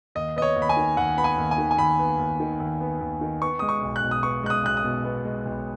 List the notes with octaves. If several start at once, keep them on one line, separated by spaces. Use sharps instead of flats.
D#2 D#5
B3 D#5
C#5
D#2
B5
G#5
D#3
D#2 F#5
B3 B5
G#5
D#2
G#5
D#3
G#5
D#2 B5
B3
D#2
D#3
D#2
B3
D#2
D#3
B3 C#6
G#3 D#6
C#6
B1
F#6
B2
D#6
B3 C#6
G#3 F#6
D#6
B1 F#6
D#6
B2
B3
G#3
B1